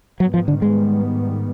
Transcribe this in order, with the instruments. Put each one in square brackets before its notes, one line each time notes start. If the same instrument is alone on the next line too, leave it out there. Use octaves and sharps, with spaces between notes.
[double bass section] G#2 D#3 G3 B3 [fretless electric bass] F#3
[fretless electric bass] F3
D3
G#3